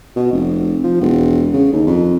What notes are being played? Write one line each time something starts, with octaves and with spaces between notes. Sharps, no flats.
B2
F1
F3
E1
C#3
D#2
F2